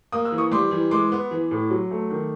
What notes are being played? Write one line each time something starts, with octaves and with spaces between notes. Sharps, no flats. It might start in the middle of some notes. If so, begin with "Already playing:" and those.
A#3 D#6
E6
E3
C#6 D#6
G3 C6 D6
E3
G#3 C6 D6
B3
E3
A2
F#3
A3
D#3